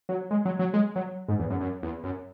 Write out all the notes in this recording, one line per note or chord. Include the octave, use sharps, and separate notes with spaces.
F#3
G#3
F#3
F#3
G#3
F#3
G#2
E2
F#2
F#2
E2
F#2